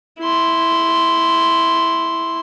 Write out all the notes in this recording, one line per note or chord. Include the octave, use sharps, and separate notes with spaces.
E4 C6